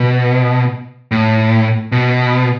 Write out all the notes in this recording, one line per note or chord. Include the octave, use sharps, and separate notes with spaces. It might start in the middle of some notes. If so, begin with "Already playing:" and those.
Already playing: B2
A2
B2